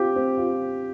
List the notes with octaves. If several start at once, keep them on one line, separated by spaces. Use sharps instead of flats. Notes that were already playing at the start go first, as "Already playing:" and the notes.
Already playing: C4 F4 G4
C4
F4